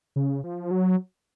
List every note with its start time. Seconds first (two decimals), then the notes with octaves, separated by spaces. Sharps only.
0.16 C#3
0.43 F3
0.71 F#3